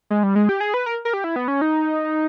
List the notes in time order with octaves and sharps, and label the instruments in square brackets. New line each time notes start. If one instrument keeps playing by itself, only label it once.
[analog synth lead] G#3
G3
G#3
G4
G#4
B4
A#4
A#4
G4
E4
B3
C#4
D#4